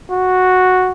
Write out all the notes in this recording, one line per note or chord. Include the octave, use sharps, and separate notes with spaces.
F#4